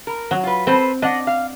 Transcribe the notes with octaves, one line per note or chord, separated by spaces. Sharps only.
A#4
F#3
F4 B4
C4 A4 B4 C5
D4 D#5 F#5
F5